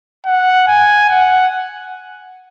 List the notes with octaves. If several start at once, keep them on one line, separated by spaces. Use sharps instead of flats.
F#5
G#5
F#5